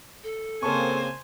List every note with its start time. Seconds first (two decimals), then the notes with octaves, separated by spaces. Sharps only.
0.24 A4
0.63 C#3 A#3 C4 C5 G#5 A5 C#6